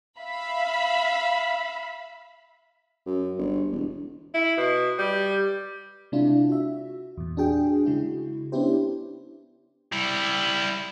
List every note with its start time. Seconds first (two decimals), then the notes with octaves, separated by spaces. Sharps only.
0.17 E5 F5 B5
3.06 F#2
3.38 G1
3.71 E1
4.34 E4
4.57 B2
4.98 G3
6.12 C3 G#3 D4 E4 F4
6.49 F#4 E5
7.17 E2 A#2
7.37 D4 F#4 G#4 G5
7.85 C#3 G#3 E4 F#4
8.52 B3 C#4 D4 E4 G4 C5
9.92 G3 E4